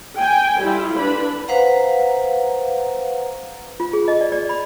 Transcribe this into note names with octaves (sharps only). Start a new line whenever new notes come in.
G5 G#5
G3 E4 F4
D4 B4 B5
B4 C5 F5 F#5 A#5
F4
G#4
D#5
D5
D5
B5